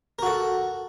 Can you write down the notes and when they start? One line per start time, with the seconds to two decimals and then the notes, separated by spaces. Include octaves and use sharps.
0.19 A#4
0.22 F#4
0.26 A4